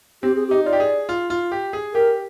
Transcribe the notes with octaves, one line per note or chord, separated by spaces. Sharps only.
C4 G4
G#4
D#4 G4
F4 D5
G4
G#4
F4
F4
G4
G#4
G4 A#4